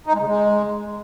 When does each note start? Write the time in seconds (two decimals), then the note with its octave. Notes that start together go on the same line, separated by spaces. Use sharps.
0.06 D#4
0.13 G#3
0.20 C#3
0.27 G#3